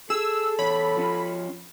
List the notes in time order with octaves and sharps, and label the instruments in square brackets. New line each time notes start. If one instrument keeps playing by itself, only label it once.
[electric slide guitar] G#4 [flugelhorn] A4 [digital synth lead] E6
[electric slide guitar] E2 C#5 [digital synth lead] B5
[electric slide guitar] F3 C#4